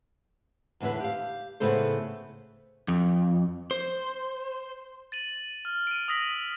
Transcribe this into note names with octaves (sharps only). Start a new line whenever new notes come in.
E2 A2 D3 E4 B4
G4 F5
A2 C#3 B3 A4 C5
F2
C5
A6 D#7 F#7
F6
D7 D#7
D#6 E6 A#6 B6 F#7